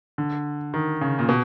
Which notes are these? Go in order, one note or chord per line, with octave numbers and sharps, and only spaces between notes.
D3
D#3
C#3
A#2
B2